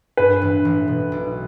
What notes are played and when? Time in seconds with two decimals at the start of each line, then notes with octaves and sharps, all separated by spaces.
0.17 G2 B4
0.42 A1
0.65 A1
0.88 B2
1.12 B1